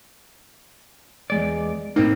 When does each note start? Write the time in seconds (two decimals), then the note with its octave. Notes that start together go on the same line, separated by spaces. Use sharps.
1.30 E2 G#3 D5
1.96 A2 A#3 C4 D#4